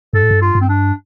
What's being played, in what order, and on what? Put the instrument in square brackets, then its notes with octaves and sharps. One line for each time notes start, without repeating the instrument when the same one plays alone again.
[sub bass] G2 [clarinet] A4
[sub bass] A2
G2
[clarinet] F4
[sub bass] G2
[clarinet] C4
D4